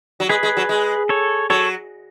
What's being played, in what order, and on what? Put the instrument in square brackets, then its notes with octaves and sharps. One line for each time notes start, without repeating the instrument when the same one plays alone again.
[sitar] F#3
[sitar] G#3 [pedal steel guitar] G#4 B4
[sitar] G#3
F#3
G#3
[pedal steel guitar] A4 C#5
[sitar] F#3 [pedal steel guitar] A4 C#5